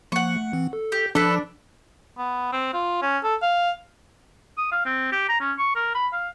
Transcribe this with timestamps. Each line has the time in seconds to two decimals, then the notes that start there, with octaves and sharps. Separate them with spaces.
0.12 F3 A#3 F#5 C#6
0.37 A3
0.53 E3 C4
0.73 A4
0.92 G4
1.15 F3 D4 A4 B4
2.18 B3
2.52 C4
2.74 F4
3.02 C#4
3.24 A4
3.42 F5
4.58 D#6
4.72 F5
4.86 C4
5.12 G4
5.29 A#5
5.40 C#4
5.58 C#6
5.76 A#4
5.95 B5
6.13 F5